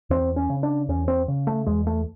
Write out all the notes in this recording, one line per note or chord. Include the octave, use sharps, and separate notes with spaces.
E2 C4
C#4
C#3
D4
E2 C#4
C4
C#3
A3
E2 G#3
A3